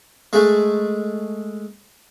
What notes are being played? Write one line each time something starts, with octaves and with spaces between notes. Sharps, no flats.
G#3 A3